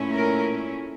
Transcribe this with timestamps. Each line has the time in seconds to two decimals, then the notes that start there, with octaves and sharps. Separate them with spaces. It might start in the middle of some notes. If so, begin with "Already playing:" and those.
Already playing: A#2 A3 C#4 E4
0.12 A#4